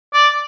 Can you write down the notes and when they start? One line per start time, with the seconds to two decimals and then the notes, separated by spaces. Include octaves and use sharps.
0.13 D5